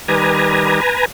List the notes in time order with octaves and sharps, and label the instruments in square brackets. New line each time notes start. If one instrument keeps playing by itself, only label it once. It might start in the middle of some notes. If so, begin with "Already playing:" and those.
[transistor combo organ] D#3 G3 [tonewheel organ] B4 G#5 A#5